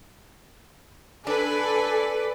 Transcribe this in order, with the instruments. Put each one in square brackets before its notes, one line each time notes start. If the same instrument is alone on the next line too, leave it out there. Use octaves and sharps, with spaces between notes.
[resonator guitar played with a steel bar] D4 [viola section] A4 D5 [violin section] B4 [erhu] G#5